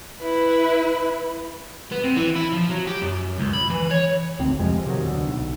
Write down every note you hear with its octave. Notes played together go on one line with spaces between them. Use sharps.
E4 B4
B3
C3
E3
E4
F3
F#3
G4
F#2
C#2
B5
E3
C#5
G#1 D2 C4
F2 C3 F3 G#3
C3 D#3 F#3
D2 B2 D3
B1